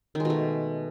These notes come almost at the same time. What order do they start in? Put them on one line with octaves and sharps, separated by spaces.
D#3 G#3 B2 A3